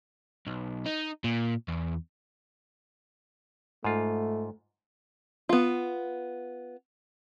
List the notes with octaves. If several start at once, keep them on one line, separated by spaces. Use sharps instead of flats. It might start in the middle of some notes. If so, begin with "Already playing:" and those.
B1
D#4
A#2
E2
G#2 A3 F4
B3 F4